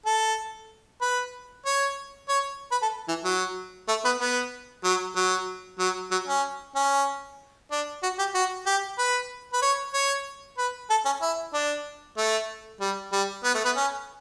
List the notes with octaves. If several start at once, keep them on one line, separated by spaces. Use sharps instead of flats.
A4
B4
C#5
C#5
B4
A4
E3
F#3
A3
B3
B3
F#3
F#3
F#3
F#3
C#4
C#4
D4
F#4
G4
F#4
G4
B4
B4
C#5
C#5
B4
A4
C#4
E4
D4
A3
G3
G3
B3
A3
B3
C#4